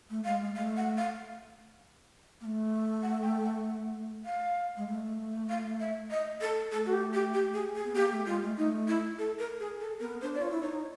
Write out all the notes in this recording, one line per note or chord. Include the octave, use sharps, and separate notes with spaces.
A3
G#3 F5
G#3
A3 F5
F#5
F5
A#3
A3
F#5
G5
F#5
F5
G#3
A3
F5
E5
D#5
A4
A3 A4
F#4
G4
G4
G4
G#4
G#4
B3
A#3 G4
A3
G#3 F4
A3
A3 D#4
E4
A4
A#4
G#4
A4
B3 A#4
D4 C5
D5
F4 C#5
E4
D#4 C#5